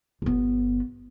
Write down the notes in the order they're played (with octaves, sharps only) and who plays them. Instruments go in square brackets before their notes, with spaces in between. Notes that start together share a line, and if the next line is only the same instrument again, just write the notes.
[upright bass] G1 B3